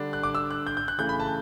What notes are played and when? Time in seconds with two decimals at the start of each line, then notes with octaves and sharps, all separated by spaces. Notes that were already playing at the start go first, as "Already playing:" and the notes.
Already playing: D3 G3 D4
0.13 F#6
0.23 D6
0.35 E6
0.51 F#6
0.67 G6
0.77 G6
0.88 F#6
0.98 C#3 E3 A3 G6
1.09 B5
1.20 A5